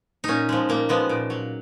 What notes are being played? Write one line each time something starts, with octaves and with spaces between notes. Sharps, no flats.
A#2 C#4 D#4
F3 G#3
A#2 A#3
F3 G#3 B3
A#2
F#3